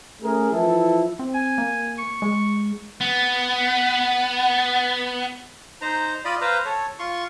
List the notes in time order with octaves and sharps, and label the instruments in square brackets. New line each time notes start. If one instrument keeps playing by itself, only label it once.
[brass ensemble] A3 C#4 G#4 A#4
E3 F3 E4 A4
[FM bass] C4
[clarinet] G#5
[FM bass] A#3
[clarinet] C#6
[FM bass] G#3
[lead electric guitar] B3
[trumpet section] F#5
[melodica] D#4 C5 A#5
F4 D5 D#5 B5
B4 C5 F5 A#5
A4 C#5
F4 C6 C#6